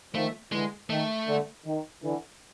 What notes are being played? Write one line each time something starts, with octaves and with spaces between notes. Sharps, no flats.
D#3 F3 A3
D3 E3 G#3
D#3 A3
D3
D#3
D3 E3